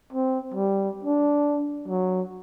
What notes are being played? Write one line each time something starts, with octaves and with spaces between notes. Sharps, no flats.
C4
G3
D4
F#3